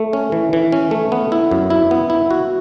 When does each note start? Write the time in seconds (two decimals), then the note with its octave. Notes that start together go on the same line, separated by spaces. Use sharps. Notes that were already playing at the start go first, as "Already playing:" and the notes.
Already playing: A3
0.13 C#4
0.32 E3
0.53 E3
0.72 C#4
0.91 A3
1.12 B3
1.32 E4
1.51 F#2
1.70 E4
1.91 B3
2.10 E4
2.31 F#4